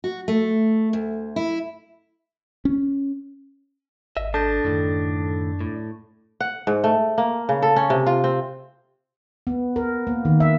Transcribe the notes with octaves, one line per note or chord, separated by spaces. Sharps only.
F#4
A3
D2
E4
C#4
G#1 D#5 E5
D4 A4 A5 G6 A#6
F#2 A2 D3 D#3
A2
F#5
G#2
A3
A#3
C#3
A4
C#4
C3
F4
C4
B3
A#4
A#3
D#3
E5